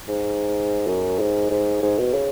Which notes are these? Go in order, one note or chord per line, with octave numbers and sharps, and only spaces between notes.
G#2
F#2
G#2
G#2
G#2
B2
C#3